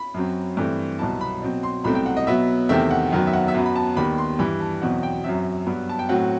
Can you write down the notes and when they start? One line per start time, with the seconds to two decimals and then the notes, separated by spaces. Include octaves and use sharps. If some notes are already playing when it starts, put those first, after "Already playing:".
Already playing: B5
0.14 F#2 F#3 C4
0.57 G2 E3 A3 C4
0.99 C2 B2 F#3 B3 A5
1.21 B5
1.42 B2 F#3 C4
1.63 C6
1.84 C2 B2 F#3 A3 C4 B5
1.95 G5
2.06 F#5
2.17 D#5
2.27 B2 F#3 B3 E5
2.69 E2 C3 D#3 A3 C4 E5
2.91 F#5
3.12 F#2 D#3 F#3 B3
3.27 E5
3.33 F#5
3.48 E5
3.54 F#2 F#3 B3 F#5
3.65 B5
3.76 A5
3.96 D#2 D#3 G3 B3 B5
4.18 C6
4.39 G2 E3 G3 B5
4.60 A5
4.82 E2 B2 F#3 C4 F#5
5.03 G5
5.24 F#2 F#3 C4 E5
5.66 G2 F#3 B3
5.89 A5
5.99 G5
6.09 A2 F#3 C4 F#5